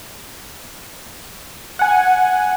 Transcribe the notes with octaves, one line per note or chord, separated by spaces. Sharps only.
F#5 G#5